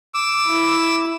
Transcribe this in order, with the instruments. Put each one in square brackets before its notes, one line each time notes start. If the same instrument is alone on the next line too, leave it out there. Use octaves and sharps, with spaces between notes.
[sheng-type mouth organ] D6 E6
[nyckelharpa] E4